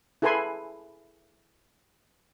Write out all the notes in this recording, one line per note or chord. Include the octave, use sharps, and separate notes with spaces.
E4 G#4 A4 B4 G#5 C6